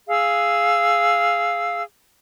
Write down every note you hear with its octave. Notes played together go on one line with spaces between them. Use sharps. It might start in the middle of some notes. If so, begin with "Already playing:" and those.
G#4 F5 E6